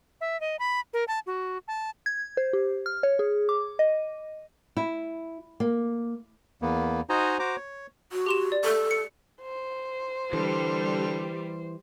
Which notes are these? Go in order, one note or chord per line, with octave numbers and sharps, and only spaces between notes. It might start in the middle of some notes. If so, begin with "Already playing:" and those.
E5
D#5
B5
A#4
A5
F#4
A5
G#6
C5
G4
F6
C#5
G#4
D6
D#5
E4
A#3
E2 A#3 B3
D#4 F#4 C5 D#5 G#5 A#5
F#4 C5 A#5 D6
C#5
F#4
G4 C6 E7
D5
A4
C#7
C5
D3 E3 G3